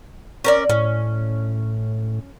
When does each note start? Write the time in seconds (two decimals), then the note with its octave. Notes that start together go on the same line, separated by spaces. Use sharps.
0.44 C#4 A#4 D5
0.69 A2 C#4